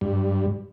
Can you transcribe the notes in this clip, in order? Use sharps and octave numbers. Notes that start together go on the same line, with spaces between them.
G2